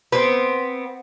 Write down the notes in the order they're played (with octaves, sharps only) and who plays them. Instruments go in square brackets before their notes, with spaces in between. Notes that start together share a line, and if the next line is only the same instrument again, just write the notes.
[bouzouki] B3 C4